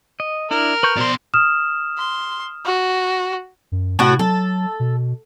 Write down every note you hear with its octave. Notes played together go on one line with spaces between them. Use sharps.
D#5
D4 E4 A#4
B4 C#6 G6
B2 C5 D5 C6
D#6 F6 E7
C6
F#4
F#2
A2 C3 F#4
F#3 A4
B2